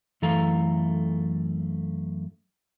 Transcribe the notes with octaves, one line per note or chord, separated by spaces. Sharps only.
F#2 E3 A3 A4 F5 A#5